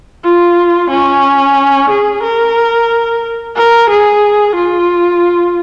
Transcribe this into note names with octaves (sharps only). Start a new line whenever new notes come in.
F4
C#4
G#4
A#4
A#4
G#4
F4